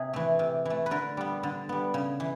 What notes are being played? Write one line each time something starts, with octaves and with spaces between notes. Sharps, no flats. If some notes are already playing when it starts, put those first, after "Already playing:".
Already playing: C3 G#4
E3 A3
C3
E3 A3
B4
D3 A#4
G3 B3
D3
G3 B3
C#3
E3